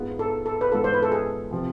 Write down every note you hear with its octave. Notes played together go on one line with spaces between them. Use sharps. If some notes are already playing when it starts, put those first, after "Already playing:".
Already playing: G#2 G#3 B3 F4
A4
A4
B4
G#2 G#3 B3 F4 A4
C5
B4
A4
G#4
C3 F3